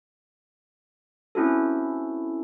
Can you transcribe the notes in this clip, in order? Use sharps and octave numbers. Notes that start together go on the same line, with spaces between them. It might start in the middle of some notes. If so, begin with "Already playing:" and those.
C4 C#4 E4 F#4 A4